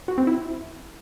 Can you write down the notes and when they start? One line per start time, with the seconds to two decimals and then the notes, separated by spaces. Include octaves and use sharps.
0.08 F#4
0.18 C4
0.27 E4